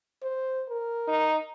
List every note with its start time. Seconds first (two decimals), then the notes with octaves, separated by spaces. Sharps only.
0.23 C5
0.70 A#4
1.08 D#4